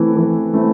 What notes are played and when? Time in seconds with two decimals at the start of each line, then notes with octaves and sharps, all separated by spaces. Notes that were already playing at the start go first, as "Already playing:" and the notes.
Already playing: E3 A3 C4 E4
0.16 E3
0.54 A3 C4 E4